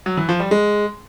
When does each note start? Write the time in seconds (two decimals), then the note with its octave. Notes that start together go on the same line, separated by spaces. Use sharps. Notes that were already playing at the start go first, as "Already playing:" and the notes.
0.06 F#3
0.17 E3
0.29 F3
0.40 G3
0.51 G#3